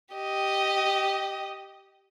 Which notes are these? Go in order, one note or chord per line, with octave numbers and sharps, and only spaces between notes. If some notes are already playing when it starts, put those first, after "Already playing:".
G4 D#5